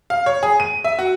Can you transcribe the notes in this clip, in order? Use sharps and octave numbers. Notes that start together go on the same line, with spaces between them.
F5
C#5
G#4
D#7
E5
F#4